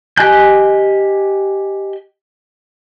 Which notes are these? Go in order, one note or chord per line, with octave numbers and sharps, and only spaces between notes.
G4 D#5 G#5 F#6 G6